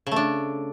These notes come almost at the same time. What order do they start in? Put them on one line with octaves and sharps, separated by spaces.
C#3 A3 D4